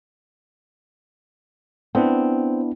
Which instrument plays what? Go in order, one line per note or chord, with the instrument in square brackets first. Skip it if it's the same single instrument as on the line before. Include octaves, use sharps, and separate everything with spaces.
[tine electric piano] B3 D4 E4 [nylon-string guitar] C4